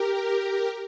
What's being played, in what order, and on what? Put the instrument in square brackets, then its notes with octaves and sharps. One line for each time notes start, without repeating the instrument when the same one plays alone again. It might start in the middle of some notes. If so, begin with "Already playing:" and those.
Already playing: [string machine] G4 A#4